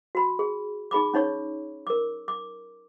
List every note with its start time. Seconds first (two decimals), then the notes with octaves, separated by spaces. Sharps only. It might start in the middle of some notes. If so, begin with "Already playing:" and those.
0.15 F#4 B5
0.39 G#4
0.91 D#4 G#4 B5 D6
1.14 C#4 D#4 C#5 C#6
1.87 A#4 D6
2.28 D6